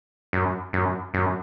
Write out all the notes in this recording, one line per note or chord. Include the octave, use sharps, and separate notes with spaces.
F#2
F#2
F#2